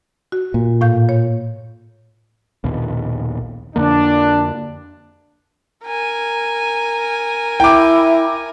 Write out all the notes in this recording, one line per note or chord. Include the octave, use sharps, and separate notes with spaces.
F#4
A#2
A2 F5 G6
C#5
A#1 D#2 B2
F2 D3 A#3 D4
A#4 G#5
E4 G5 D6